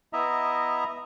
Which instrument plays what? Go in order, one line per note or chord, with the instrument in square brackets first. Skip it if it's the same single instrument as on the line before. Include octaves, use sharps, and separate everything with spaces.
[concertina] B3 E4 D#5 E5 A#5